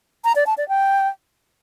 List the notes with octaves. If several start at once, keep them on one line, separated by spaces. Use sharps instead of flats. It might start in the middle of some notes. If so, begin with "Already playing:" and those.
A#5
D5
A5
D5
G5